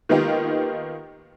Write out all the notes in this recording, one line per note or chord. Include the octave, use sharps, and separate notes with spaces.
D#3 A#3 B3 D#4 F4 G4